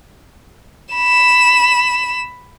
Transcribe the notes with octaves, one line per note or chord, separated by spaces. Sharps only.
B5 E7